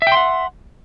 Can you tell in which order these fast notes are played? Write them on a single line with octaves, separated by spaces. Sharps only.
E5 G5 C6 F#5